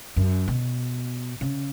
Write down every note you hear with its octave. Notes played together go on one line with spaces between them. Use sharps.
F#2
B2
C#3